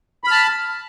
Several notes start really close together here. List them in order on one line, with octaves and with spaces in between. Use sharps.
B5 F6 A5